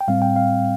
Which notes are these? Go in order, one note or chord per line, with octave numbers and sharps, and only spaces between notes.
G5
A2 G3 C4 F5
G5
F5